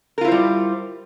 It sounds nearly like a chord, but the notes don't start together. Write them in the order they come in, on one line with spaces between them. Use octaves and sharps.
A#4 F4 E4 C5 G3